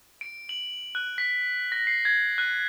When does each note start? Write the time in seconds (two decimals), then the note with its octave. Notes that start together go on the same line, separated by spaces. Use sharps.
0.21 D7
0.49 F#7
0.95 F#6
1.18 B6
1.72 A#6
1.87 C7
2.05 G#6
2.38 F#6